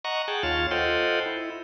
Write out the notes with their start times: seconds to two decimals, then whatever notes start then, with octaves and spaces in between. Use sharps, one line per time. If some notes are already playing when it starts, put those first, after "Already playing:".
0.05 D#5 F#5 A#5 C#6
0.28 G#4 F#5 G5 A5
0.43 D#2 F4 C#5 F5 A6
0.71 F4 A4 C5 D#5 F#5 G5
1.26 E4